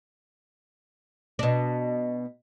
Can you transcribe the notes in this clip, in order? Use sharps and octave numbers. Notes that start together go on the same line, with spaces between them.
B2 D4